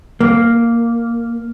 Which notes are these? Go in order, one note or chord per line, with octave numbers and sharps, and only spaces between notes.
A#3